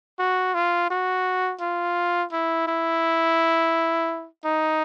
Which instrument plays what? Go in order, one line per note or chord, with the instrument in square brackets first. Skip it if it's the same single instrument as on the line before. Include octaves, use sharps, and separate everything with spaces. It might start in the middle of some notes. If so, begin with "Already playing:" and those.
[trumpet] F#4
F4
F#4
F4
E4
E4
D#4